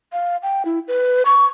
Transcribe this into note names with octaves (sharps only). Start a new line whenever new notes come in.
F5
G5
E4
B4
C#6